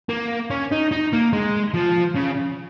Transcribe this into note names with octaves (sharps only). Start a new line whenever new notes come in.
A#3
C#4
D#4
D#4
A#3
G#3
F3
C#3